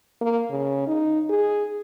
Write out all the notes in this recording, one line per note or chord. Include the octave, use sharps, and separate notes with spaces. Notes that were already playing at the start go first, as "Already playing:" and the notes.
A#3
C#3
D#4
G#4